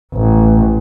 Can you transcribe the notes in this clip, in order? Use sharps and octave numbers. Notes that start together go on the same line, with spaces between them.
A1